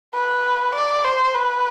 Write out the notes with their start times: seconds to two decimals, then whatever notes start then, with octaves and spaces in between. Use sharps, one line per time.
0.14 B4
0.75 D5
1.04 C5
1.34 B4